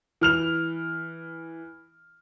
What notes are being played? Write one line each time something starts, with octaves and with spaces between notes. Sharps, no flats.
E3 F6 F7